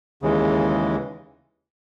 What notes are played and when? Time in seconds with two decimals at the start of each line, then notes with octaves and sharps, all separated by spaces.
0.22 D#2 C#3 E3 G#3